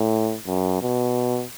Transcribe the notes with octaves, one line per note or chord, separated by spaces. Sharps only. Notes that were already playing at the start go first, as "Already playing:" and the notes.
Already playing: A2
F#2
B2